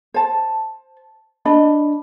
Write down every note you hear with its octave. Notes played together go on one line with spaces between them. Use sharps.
C5 A5
D4 D#5 B5